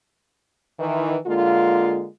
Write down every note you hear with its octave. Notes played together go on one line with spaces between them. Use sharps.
D#3 E3
D3 G#3 A#3 F4